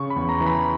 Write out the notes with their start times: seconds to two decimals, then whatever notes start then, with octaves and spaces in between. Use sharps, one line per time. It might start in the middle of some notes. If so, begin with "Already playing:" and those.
Already playing: C#3 C#6
0.10 B5
0.16 E2
0.29 A#5
0.41 E3
0.46 B5